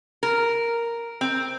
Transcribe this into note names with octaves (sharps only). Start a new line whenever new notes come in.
A#4
C4